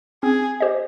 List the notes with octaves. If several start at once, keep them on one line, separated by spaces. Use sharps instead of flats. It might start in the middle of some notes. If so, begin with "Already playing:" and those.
C4 G#4
G4 C5 D#5